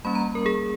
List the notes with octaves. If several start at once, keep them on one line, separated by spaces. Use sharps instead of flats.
G3 A#3 C#4 B5
A#5
A#4
G#4